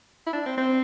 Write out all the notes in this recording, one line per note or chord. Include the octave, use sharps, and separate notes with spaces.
E4
D4
C4
C4